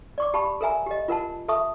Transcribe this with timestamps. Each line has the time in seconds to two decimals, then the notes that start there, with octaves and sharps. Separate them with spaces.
0.18 D5 C#6 D6
0.34 G4 A5 B5 C#6
0.61 A4 A#4 E5 G#5 A#5
0.87 G4 D#5
1.08 F4 A#4 F#5 A5
1.48 A4 E5 A5 C#6 D#6